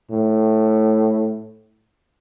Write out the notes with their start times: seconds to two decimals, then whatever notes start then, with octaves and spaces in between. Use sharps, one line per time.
0.11 A2